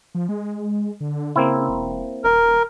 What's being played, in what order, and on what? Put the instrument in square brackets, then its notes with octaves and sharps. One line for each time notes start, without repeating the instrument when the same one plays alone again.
[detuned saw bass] F3
G#3
D3
[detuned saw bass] C#3 [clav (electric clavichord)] A#3 C4 E4
[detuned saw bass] E1
[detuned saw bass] D#1 [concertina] A#4